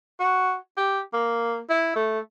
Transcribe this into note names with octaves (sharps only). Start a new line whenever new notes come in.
F#4
G4
A#3
E4
A3